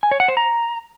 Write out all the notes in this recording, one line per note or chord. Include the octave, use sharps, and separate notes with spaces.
G#5
C#5
F#5
C5
A#5